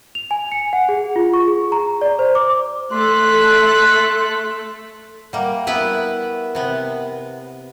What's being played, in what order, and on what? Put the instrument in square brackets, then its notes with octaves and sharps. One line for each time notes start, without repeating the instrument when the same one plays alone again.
[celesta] F7
G#5
C#7
F#5
G#4
F4
C#6
G#4
A#5
D5
C5
D6
[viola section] A3 A4 [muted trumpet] C6 [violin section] F#6 B6
[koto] G3 A#3 [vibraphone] A#4 E5 F#5
[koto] B3 E4 B4
C3 B3